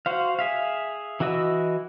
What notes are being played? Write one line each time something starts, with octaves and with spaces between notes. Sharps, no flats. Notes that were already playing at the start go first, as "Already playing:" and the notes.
F#4 C5 F5
G#4 E5 F5
E3 E4 F#4 D#5 E6